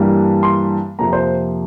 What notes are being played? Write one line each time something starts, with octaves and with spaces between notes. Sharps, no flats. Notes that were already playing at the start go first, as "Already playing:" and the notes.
Already playing: G2 E3 G3 A#3
C6
F2 C3 F3 A#3 A#5
C5